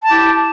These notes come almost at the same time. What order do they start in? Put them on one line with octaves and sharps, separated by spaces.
A5 G4 E4